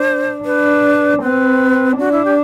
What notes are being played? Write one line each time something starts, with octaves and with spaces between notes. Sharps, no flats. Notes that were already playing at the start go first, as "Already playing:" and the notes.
Already playing: D4 C5
D4 B4
C4 B4
D4 F#4
E4
G4